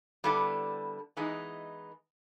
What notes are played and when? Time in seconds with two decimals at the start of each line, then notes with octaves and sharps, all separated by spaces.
0.24 D3 G3 B3 E4 A4
1.17 E3 G#3 B3 D#4